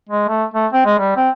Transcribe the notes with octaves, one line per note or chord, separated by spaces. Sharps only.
G#3
A3
A3
C4
G#3
G3
C4